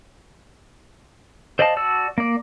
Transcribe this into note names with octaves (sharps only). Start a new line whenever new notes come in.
C5 D5 D#5 F5 A5
F#4 D5 A5 E6
A#3 D5